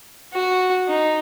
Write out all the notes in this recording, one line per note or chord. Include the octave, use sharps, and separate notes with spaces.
F#4
D#4